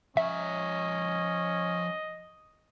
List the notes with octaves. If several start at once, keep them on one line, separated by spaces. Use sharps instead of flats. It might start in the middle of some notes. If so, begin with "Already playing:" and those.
F3 C#4 C#5 D#5 E5